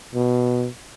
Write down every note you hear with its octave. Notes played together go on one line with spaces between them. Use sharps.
B2